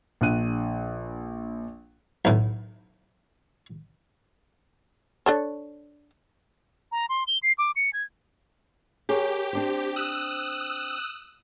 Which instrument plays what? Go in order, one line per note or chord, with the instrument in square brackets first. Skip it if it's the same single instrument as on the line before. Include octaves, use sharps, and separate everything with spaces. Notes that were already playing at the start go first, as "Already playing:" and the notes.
[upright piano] A#1 D4 F#6 D#7
[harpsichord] B1 A2
[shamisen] D4 A4 C#5
[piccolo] A#5
C6
G7
C7
D6
C#7
G#6
[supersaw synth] G4 [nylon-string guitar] G#4 A#4 C#5
[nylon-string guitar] C4 D4 C5
[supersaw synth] D#6 E6 F#6